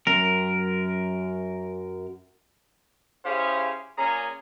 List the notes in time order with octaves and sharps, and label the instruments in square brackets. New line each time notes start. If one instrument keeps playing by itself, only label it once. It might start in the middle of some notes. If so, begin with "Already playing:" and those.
[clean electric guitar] F#2 A#4
[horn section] C#4 E4 G4 G#4 C5 F5
A#2 C#4 G#4 G#5 A#5